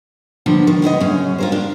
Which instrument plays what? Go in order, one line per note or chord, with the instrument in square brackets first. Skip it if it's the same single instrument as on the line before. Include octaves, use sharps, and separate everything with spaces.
[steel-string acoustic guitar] D3 F3 A#3 B3
D#3
D3 B3 C5 D#5
F#2 C#3 C#4
F4 A#4 C5
D4